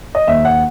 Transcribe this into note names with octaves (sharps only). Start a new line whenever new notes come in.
D#5
D#2 E5
F#5